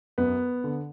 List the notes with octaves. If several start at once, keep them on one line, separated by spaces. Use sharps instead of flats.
F#2 B3
D3